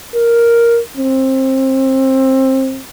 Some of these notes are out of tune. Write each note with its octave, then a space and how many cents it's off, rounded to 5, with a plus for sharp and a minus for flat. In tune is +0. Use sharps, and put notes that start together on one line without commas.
A#4 +5
C4 +20